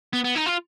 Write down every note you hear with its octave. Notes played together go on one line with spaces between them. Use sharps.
B3
B3
D#4
F4